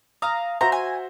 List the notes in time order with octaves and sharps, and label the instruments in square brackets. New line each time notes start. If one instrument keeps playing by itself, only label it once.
[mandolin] F5 A#5 [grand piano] D#6
[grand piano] F#4 C5 E5 [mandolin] A#5
[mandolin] G#5